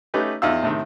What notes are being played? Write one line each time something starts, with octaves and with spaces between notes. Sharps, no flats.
A3 C#4 D#4 G4 B4
E2 D#4 F4 F5 E6
A2 C3 D#3